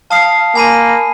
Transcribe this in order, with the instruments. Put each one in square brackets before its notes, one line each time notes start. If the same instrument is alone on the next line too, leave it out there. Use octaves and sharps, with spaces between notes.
[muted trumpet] F5 [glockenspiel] A5 D#6 C7
[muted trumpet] A#3 [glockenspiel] G#5 B5 D#7